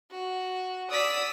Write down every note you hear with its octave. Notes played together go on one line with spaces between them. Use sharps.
F#4
D5 D#6 E6 B6